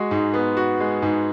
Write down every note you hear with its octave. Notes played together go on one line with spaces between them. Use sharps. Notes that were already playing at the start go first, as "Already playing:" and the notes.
Already playing: G#3 F#4
G#2
B3
F#4
G#3
G#2